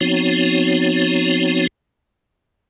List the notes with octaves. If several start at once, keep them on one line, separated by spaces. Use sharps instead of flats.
F3 B3 C4 D#4 F#4 C#5